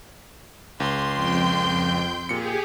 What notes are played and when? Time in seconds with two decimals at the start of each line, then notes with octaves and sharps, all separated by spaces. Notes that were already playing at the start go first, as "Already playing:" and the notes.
0.80 C#2 C6
1.14 F2 G5 G6
2.29 A#2 G4 G#4 C#7